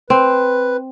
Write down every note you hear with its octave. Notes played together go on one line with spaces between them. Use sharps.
C4 B4